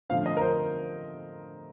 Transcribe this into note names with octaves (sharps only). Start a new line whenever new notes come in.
D3 F3 A3 C4 F5
D#5
A#4
C5